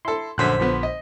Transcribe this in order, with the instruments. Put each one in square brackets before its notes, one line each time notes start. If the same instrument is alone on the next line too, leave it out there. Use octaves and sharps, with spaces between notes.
[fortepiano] E4 A4 [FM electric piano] C6
[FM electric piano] A#1 C5 B6 [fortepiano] F#2 D3 F#6
[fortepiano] D3 F3 B3
D#5